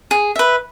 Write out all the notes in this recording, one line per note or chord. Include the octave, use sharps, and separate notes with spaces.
G#4
B4 E5